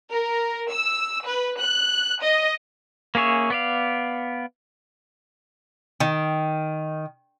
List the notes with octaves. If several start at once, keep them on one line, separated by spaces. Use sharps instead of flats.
A#4
E6
B4
F#6
D#5
A#3 C#4 G#4 C#5 E5
B3 D5 F5
D#3